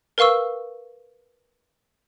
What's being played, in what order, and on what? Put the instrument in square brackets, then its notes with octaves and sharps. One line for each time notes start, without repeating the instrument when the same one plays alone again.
[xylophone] A#4 B4 F5 C#6 E6